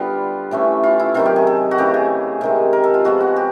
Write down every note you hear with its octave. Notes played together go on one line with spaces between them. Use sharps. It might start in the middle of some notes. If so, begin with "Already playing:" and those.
Already playing: D3 G3 B3 F4
A2 E3 A3 C#4
F4
E4
C3 D#3 F#3 F4
G4
G#4
A4
F#4
C#3 E3 A3 G4
G#4
C3 D#3 G#3
A#4
A4
F4
F3 G#3 B3 F#4
F#4
G4